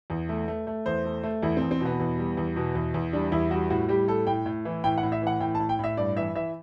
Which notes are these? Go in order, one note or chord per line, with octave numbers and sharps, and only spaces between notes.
E2
A3
A3
A3
E2 C5
A3
A3
E2 E4
E2 C4
C4
B2 B3
E2
G3
E2
B2
E2
E2
G3 D4
E2 E4
G3 F#4
A2 F#4
G3 G4
A2 A4
A2 G5
A2
E3
A2 G5
F#5
A2
E5
E3 F#5
A2 G5
A5
A2
G5
A2 E5
G2 D5
E3 E5
E3 E5